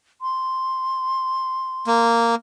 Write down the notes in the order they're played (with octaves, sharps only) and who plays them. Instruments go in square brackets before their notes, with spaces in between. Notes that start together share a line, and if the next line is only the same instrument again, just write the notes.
[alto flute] C6
[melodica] A#3